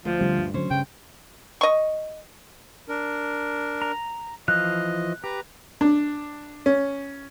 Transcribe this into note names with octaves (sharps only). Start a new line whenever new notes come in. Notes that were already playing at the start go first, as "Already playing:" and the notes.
D2 F3 C5
D3 G3 C4
G2
D3 F#3 C#4 C5 C#5
G2 C#3 G5
D#5 C#6
D4 A#4
A#5
E3 F3 D#5 F5 F#6
G4 B4 A#5
D4
C#4